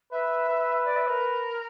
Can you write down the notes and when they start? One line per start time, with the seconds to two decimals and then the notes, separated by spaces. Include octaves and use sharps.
0.12 B4 E5
0.49 B4
0.85 D5
0.96 E5
1.09 A#4